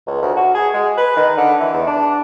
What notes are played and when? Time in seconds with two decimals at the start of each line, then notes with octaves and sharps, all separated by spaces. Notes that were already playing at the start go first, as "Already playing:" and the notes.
0.07 C#2
0.22 D2
0.36 F#4
0.54 G#4
0.74 G#3
0.97 B4
1.17 D#3
1.37 D3
1.60 E3
1.73 E2
1.87 D4